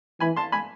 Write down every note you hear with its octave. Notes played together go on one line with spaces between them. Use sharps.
E3 G#5 B5
A5 C6
G#5 B5